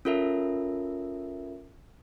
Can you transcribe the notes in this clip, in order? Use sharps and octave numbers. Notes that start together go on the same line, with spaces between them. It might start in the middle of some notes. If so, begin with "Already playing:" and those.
C#4 F4 A4 A#4 E5